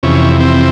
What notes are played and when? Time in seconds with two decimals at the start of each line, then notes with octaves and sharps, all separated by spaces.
0.03 F2 C3 E3 C#4
0.40 C4